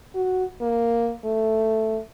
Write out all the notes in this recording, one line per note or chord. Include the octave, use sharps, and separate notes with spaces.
F#4
A#3
A3